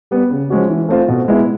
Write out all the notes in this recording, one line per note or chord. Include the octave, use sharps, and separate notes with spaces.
G3 B3
C#3
F3 G#3 C#4 F#4
E3
A3 C4 F4
B2
G#3 B3 E4